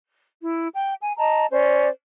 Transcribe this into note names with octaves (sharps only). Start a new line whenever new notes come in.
E4
G5
G#5
D#5 A5 A#5
C#4 C5 D5